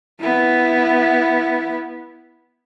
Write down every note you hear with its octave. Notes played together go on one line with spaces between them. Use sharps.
B3 E4